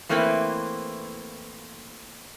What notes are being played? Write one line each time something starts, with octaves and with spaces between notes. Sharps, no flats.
E3 A3 A#3 C4 E4 B4